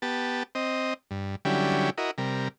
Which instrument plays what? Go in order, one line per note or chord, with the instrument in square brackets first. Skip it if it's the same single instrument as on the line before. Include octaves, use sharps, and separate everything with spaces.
[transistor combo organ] B3 G4 A5
C4 D#5
G2
D3 F#3 G3 C#4 E4 G4
E4 F#4 A#4 D#5
C3 G3 A#4